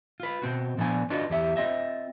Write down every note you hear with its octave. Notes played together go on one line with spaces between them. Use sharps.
F4 B4
B2 C4 F#4
A#2 F3 B3 D4 G#5
D4 F4 F#4 B4 D#5
E2 G4 E5
C4 F4 D#5 E5